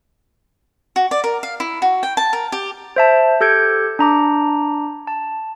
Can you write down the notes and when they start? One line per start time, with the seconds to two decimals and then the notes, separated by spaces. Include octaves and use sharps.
0.96 F#4
1.11 D5
1.24 A#4
1.43 F5
1.60 E4
1.82 F#4
2.03 G5
2.17 A5
2.33 A#4
2.52 G4
2.96 C5 E5 A5
3.41 G4 A4 G6 G#6 C#7 D7
3.99 D4 A#5 D6
5.07 A5